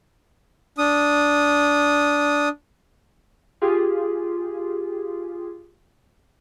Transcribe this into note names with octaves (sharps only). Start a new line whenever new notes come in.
D4 D#6
F4 G4 G#4